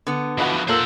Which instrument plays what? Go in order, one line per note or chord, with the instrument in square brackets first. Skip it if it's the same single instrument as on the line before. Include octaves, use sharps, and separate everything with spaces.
[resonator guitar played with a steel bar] D3 B3
[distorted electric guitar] E3 F3 [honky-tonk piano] F#4 B4 D#5
[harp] A#2 E6 [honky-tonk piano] A4 A#4 [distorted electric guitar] C5 F#5